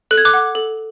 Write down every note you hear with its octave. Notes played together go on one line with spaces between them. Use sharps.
A4 F#6
G#6
D6 F#6
F#5
A4